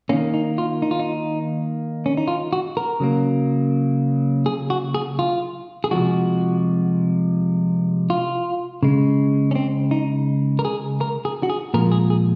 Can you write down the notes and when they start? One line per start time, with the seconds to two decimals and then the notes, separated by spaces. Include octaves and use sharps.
0.09 D#3 A#3 C#4
0.34 D#4
0.58 F4
0.82 D#4
0.91 F4
1.00 D#4
2.06 C#4
2.17 D#4
2.28 F4
2.53 F#4
2.77 A#4
3.00 C#3 F#3 A#3
4.46 G#4
4.70 F#4
4.94 G#4
5.19 F4
5.84 G#4
5.91 C3 F3 G#3 F#4
8.10 F4
8.83 C#3 G#3
9.51 C#4
9.55 C4
9.91 D#4
10.59 A#4
10.65 G#4
11.01 A#4
11.25 G#4
11.43 F#4
11.50 G#4
11.74 A#2 F3 G#3 A#4
11.92 G#4
12.10 G#4